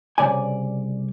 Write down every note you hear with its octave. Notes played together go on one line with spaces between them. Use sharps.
C2 F2 C#3 D5 G#5